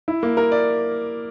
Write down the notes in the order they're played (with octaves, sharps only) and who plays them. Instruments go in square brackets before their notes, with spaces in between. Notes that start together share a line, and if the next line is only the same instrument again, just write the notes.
[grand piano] E4
A#3
A#4
D5